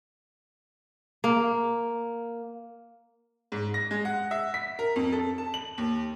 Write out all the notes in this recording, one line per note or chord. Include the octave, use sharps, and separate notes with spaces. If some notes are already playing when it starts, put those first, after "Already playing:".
A#3
G#2
A#6
G#3
F#5
E5
B6
A#4
F2
A4
A5
F#7
D#2